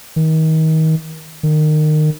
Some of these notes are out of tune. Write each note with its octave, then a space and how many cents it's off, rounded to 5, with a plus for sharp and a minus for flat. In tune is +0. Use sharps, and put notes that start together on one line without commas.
D#3 +30
D#3 -25